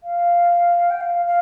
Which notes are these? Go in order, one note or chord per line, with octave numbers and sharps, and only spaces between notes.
F5
G5
F5
F5